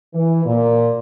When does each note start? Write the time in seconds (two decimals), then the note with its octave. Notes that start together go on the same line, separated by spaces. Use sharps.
0.14 E3
0.46 A#2